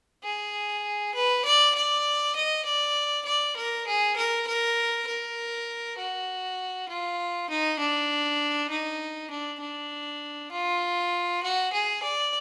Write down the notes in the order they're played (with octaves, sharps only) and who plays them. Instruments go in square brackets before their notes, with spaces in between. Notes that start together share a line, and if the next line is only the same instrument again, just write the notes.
[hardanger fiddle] G#4
B4
D5
D5
D#5
D5
D5
A#4
G#4
A#4
A#4
A#4
F#4
F4
D#4
D4
D#4
D4
D4
F4
F#4
G#4
D5